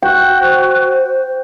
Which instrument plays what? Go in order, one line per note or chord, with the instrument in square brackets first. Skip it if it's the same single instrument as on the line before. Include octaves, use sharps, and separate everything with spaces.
[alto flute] F#4 [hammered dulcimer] G5
[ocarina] C5